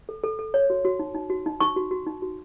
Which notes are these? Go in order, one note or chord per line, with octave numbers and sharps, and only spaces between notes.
A4
A4
A4
C#5
F#4
F#4
D#4
D#4
F#4
D#4
D#4 C#6
F#4
F#4
D#4
F#4